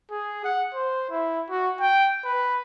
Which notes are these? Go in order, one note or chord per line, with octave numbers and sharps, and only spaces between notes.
G#4
F#5
C5
E4
F#4
G5
B4